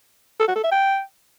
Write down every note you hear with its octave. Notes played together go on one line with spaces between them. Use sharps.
A4
F#4
A4
E5
G5